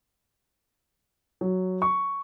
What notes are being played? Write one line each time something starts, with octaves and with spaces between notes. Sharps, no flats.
F#3
C#6